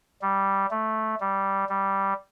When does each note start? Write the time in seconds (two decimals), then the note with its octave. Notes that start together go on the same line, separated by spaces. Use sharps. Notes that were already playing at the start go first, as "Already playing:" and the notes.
0.22 G3
0.71 A3
1.20 G3
1.69 G3